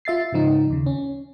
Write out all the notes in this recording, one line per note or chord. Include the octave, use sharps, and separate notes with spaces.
F4 E5 A6 C7
G#2 C#3 F3 D#4
D#2 C#3
C#4